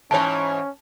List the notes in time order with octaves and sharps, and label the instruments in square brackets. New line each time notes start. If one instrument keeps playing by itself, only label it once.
[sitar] G#2 E3 C#5 [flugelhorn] C#4 [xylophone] G#5 A5